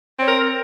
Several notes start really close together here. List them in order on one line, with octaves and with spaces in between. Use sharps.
C4 C#5 A#4